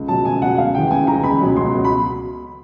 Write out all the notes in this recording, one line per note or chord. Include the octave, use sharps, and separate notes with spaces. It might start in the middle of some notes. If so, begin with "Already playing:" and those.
Already playing: C#2
B2 F#3 A5
C#2 G#5
B2 F#3 F#5
C#2 F5
C#3 E3 G5
G5
C#2 G#5
C#3 E3 A#5
C#2 B5
B2 F#3
C#2 C6
B2 F#3
B5